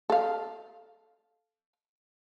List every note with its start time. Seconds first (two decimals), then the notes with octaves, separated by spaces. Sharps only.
0.10 A4 F5